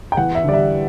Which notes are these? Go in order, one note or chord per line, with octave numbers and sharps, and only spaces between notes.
G5
E2 F#5
E5
D3 G3 D5
E5